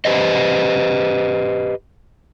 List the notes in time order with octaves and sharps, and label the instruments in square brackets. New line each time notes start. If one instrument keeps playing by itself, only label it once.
[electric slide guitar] G4 B4 C5 D#5